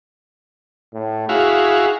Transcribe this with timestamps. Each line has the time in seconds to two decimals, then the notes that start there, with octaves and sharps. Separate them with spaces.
0.94 A2
1.29 E4 F#4 G#4 F5